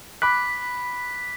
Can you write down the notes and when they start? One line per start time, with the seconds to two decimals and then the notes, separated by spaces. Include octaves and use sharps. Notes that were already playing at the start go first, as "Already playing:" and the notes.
0.22 B5 D6 F#6 B6